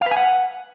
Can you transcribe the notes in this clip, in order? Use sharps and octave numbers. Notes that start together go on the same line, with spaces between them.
F5
B4
G#5
F#5